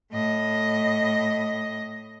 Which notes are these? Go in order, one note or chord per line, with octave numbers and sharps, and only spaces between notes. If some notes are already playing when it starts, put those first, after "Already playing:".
A2 D#5